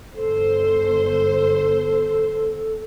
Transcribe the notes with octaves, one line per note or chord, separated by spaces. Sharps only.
G1 A4 C5